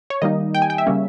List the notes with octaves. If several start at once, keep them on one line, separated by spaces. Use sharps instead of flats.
C#5
D#3 G3 A#3 D#4 D#5
G5
G#5
G5
E5
C#3 G3 A#3 C#4